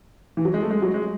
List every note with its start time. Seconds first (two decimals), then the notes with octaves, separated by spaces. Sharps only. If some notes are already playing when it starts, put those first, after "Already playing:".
0.37 E3
0.45 F#3
0.54 G#3
0.63 A3
0.71 G#3
0.82 F#3
0.94 G#3